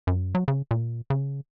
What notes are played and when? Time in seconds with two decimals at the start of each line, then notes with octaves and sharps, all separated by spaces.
0.07 F#2
0.35 F#3
0.48 C#3
0.71 A#2
1.10 C#3